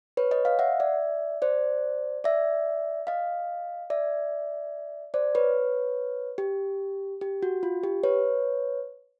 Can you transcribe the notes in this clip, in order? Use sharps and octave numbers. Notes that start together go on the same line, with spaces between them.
B4 C#5
C#5 D#5
D#5 F5
E5 F#5
D5 E5
C5 D5
D5 E5
D#5 F5
D5 E5
C5 D5
B4 C#5
G4
G4
F#4
F4
G4
B4 C#5